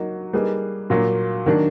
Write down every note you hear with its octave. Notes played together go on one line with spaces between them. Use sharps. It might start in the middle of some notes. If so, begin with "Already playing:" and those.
Already playing: F#3 A#3 D#4 F#4
G3 A#3 D#4 G#4 B4
A#2 F#3 A#3
D#3 F#3 A#3 D4